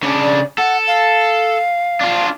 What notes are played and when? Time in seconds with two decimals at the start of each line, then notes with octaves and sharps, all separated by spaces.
0.03 C#3 C#4 D4
0.21 D5
0.58 A4 F#5
0.87 F5
2.01 D4 F4